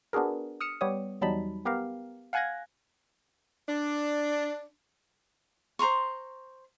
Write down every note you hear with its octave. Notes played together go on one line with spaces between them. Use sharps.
B3 D4 F#4 G#4 A#4
D#6 F6 C#7 E7
G3 B3 G4 C#5 D#6
E2 F#3 G3 D#4 A5 B5
B3 G4 A#4 F5
F5 F#5 G#5 F#6 G#6 A#6
D4
C5 A#5 C6 C#6